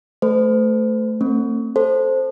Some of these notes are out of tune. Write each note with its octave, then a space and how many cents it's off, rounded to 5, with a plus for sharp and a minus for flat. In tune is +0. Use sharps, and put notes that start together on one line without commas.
A3 +0 A4 +0 C5 -40
A3 +40 C4 +25
A4 +0 C5 +0